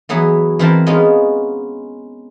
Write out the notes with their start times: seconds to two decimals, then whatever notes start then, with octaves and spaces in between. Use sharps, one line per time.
0.09 E3 F#3 B3 E4 G#4
0.59 E3 C4 E4 A#4 C5 A5
0.87 G#3 B3 C#4 D#4 F4